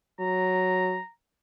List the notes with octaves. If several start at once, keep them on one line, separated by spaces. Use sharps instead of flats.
F#3 A#5